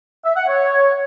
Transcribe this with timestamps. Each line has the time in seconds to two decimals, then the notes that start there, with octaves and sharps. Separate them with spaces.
0.25 E5
0.36 F#5
0.48 C#5